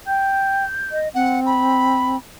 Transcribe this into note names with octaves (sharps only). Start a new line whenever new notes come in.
G5 G6
D#5
C4 F#5
B5